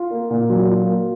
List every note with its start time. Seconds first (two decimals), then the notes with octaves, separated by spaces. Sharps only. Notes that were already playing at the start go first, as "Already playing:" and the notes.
Already playing: F4
0.11 A#3
0.30 A#2
0.49 F#3
0.69 F4
0.88 A#3